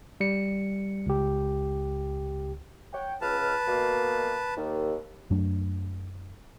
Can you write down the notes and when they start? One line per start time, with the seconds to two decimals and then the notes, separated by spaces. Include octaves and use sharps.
0.20 G3 C#7
1.06 C#2 G4
2.92 C#5 F#5 G5
3.21 C#2 B4 A5 F6
3.67 B2 A#3
4.56 D#2
5.30 F#2 F#3 A3 D4